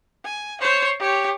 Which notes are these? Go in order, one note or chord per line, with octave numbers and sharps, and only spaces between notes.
G#5
C5 C#5
G4 C#5